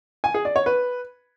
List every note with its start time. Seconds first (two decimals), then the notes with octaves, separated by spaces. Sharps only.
0.24 G#5
0.34 G#4
0.45 D5
0.56 C#5
0.66 B4